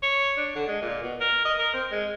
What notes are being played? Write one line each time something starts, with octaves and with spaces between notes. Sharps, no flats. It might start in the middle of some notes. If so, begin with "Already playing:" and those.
C#5
D4
D3
G#3
A#2
B2
A#4
D#5
A#4
C4
G#3